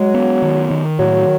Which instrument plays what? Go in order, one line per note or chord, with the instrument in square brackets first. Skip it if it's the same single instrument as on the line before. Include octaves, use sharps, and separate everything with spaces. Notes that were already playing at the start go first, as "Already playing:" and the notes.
Already playing: [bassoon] F#3 [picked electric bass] G#3
[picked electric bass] B3
D#3
D#3
[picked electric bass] A2 [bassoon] F#3